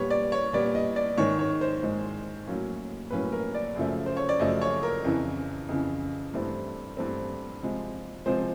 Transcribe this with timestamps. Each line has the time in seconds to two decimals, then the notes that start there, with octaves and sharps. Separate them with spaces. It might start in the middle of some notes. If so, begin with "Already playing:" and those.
Already playing: A#2 G3 B3 C#5
0.10 D5
0.32 C#5
0.53 A#2 G3 B3 D5
0.75 D#5
0.96 D5
1.18 G#2 D#3 G#3 C#5
1.39 C#5
1.61 C5
1.83 G#2 D#3 G#3
2.47 A2 F#3 A#3 C#4
3.11 A2 F#3 A#3 C#4 B4
3.32 A#4
3.54 D5
3.76 F#2 C#3 F3 A3
4.06 C5
4.17 C#5
4.29 D5
4.39 F#2 C#3 F3 A3 D#5
4.61 C#5
4.83 A#4
5.04 F2 C#3 E3
5.69 F2 C#3 E3
6.33 G2 E3 A3 C4
6.97 G2 E3 A3 C4
7.62 C3 F3 G#3
8.26 C3 F3 G#3 C5